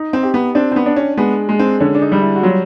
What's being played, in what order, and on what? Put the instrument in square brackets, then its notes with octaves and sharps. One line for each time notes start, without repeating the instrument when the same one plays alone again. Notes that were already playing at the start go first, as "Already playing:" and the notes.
Already playing: [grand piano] D#4
[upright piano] C4
[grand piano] G4
[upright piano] B3
[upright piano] C4 [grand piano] D4
[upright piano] C4
B3
[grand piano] D4
[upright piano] C#4
[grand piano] G#3 [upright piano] B3
[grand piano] G#3
[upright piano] C4
[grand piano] D3 [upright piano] C#4
[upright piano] D4
D#4
[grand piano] G3
[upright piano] E4
F#4
[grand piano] F#3 [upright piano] F4